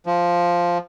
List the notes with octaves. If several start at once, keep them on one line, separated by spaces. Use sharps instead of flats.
F3